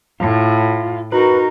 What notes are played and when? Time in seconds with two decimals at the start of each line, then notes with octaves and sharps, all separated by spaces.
0.20 A2 F4
1.12 D#4 F#4 A#4 B4